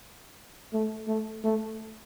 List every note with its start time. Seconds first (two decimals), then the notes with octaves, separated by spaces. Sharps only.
0.73 A3
1.08 A3
1.44 A3